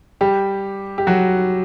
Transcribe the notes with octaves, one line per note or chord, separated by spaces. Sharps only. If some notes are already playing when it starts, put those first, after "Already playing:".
G3 G4
G4
F#3 F#4